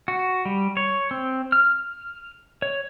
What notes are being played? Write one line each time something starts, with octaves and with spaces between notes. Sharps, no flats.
F#4
G3
C#5
C4
F6
C#5